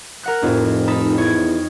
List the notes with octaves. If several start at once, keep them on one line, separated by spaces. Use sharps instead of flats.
A#4 F#5 F#6
F1 F2 A2
D#4 A4 B5
E2 C#5 G#6